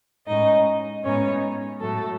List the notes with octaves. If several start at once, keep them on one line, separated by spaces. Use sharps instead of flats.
A2 G#3 C#4 D#4 D#5
A2 G#3 B3 C#4 D#4 C#5
A2 F#3 A3 A4